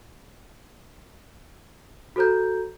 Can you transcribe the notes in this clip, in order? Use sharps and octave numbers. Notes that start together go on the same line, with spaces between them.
F#4 A4 C5 A#5 G6